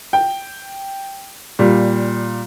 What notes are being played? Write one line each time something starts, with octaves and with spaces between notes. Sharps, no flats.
G5
A#2 G3